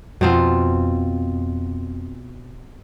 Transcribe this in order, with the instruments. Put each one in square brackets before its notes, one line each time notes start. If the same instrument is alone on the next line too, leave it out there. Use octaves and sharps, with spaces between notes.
[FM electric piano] F2 [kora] B2 C4 F4